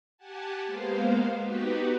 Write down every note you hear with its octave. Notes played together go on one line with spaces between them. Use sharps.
G4 F#5 G#5 A5
G#3 A#3 B3 C5 F5
B3 D#4 F#4 G4 B4